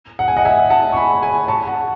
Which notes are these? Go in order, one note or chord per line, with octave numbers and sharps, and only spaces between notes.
F#5
G#5
D#5 F#5
E5 G#5
F#5 A5
C#6
G#5 B5
G#5 B5
A5 C#6
F#5 A5